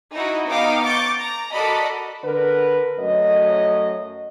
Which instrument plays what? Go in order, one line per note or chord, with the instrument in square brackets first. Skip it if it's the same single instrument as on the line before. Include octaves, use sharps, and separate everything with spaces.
[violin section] D#4 E4 F#4
B3 D#4 F5 G5 D6
C#6 D6 G6 A6
A#5
F#4 A4 A#4 D5 D#5 B5
[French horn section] D3 A#4 B4
F#2 A3 C#5 D#5